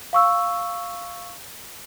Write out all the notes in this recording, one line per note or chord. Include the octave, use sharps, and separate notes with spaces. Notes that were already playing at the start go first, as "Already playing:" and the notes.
F5 C#6 E6